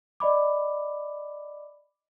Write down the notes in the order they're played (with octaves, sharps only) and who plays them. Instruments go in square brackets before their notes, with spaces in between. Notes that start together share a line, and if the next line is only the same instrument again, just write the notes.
[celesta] D5 D#5 B5 D6